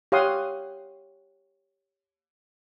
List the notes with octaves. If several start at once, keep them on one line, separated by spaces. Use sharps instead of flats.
G4 C#5 F5 F#5 C6 D#6